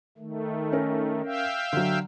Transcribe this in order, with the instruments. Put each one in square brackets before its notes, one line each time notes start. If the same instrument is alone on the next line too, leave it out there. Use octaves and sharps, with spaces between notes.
[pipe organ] D#3 A3
[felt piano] C#4 A#4
[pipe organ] E5 F5 G5
[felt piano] D3 F#3